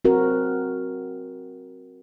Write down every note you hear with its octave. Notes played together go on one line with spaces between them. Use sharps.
C4 F#4 A#4